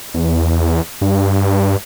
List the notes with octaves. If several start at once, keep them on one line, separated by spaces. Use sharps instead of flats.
E2
G2